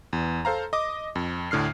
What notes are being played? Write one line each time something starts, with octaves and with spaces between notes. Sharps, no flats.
E2
A4 C5 F5 A#5
D#5 D6
F2
D2 A2 D3 F6 C7